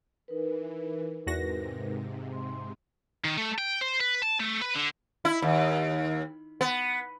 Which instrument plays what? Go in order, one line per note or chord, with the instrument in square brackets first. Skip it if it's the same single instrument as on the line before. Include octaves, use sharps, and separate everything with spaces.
[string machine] E3 [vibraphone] D#4 A#4 B4
[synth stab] E2 F#4 A#6 [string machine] G#2 C3
[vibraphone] C6
[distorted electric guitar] D#3
A3
G5
C5
B4
A5
A3
B4
D3
[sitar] E4
D#2
B3